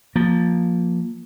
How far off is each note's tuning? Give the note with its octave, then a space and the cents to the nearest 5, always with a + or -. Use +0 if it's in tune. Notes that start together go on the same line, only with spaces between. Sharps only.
F3 +10 A#3 +5